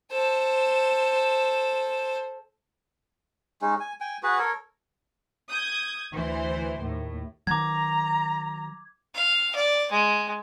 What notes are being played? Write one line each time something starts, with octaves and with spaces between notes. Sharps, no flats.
A4 C5
G#3 C#4 D#4
G#5
G5 G#5
F#4 G#4 B4
A4 A#4 C#5
D#6 G6 G#6
D2 E3 C5
D#2 A2
D#3 F#3 A#5 D6 G#6
F5
D5
G#3